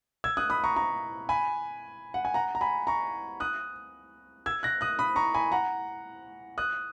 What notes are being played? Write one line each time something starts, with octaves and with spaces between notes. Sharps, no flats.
E6 G#6
D#6 F#6
B5 D#6
A#5 C#6
A#5 C#6
G#5 B5
F#5
G#5
F#5 A#5
A#5
G#5 B5
A#5 C#6
D#6 F#6
E6 G#6
F#6 A#6
D#6 F#6
B5 D#6
A#5 C#6
G#5 B5
F#5 A#5
D#6 F#6